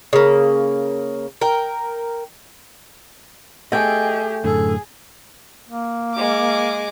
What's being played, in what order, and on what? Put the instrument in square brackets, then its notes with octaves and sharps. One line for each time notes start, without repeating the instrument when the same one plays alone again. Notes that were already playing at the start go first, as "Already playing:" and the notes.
[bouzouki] C#3 A#3
A#4 G5
[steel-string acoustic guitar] A3 G5 [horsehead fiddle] G4 G#4 [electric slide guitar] D#5
[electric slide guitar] F#2 A2 D3 [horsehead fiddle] G#4 [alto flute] A4
[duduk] A#3
[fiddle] G#3 D6